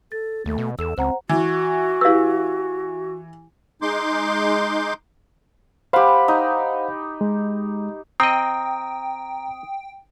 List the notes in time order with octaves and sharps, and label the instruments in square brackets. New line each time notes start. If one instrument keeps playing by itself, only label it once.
[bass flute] A4 [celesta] A6
[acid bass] D#2 [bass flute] A3
[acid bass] B2
[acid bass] E2 [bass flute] A4 [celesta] E6 E7
[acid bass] C#2 [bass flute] C4 [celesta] C5 F#5 A#5
[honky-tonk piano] E3 [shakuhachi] F#4
[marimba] E4 G4 B4 [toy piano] F5 E6
[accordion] G#3 D#4 C6 D6 G6
[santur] G4 B5 [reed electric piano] C5 F5 F#5
[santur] D#4
[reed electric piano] G#3
[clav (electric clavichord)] C4 D#5 [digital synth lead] G5 [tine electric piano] A#5 [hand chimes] D#6